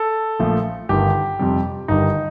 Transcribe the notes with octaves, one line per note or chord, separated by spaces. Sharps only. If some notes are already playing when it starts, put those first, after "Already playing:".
Already playing: A4
A#1 A#2 F3 A3
G1 G2 D#3 G4
F2 C3 G3
G1 G2 D#3 G3 D#4